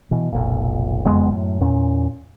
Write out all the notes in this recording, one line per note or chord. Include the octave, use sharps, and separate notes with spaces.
B2 E3
F1 B1 A#2
F#1 F2 G#3 B3
F#2 A2
E2 A#2 C#4